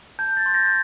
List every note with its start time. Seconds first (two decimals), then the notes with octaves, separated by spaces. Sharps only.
0.19 A5 G6
0.37 A6
0.46 C6
0.54 G6 A#6